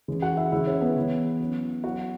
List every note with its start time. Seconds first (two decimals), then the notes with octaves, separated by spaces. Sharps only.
0.08 C#3 E3 G#3
0.22 F#4 F#5
0.37 E4 E5
0.52 C#3 E3 G#3 C#4 E4 E5
0.67 C#4 C#5
0.81 B3 B4
0.96 E3 C#4 E4
1.40 F#3 C#4 E4
1.84 F#3 E4 F#4